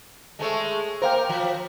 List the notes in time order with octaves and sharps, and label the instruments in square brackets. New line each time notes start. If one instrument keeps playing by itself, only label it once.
[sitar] G#3 A3 C#5
[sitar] A#3 A#4 [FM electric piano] C5 F5 G5
[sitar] F3